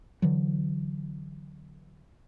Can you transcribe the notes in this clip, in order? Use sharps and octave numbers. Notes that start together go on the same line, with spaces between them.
D3 E3 F#3